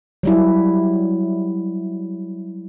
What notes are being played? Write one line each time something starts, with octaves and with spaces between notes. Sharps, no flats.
F#3 G3 E4